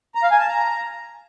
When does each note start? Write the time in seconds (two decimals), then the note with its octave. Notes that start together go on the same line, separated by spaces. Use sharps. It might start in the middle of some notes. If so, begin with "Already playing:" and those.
0.15 A#5
0.23 F5
0.31 G#5
0.39 A5
0.47 A#5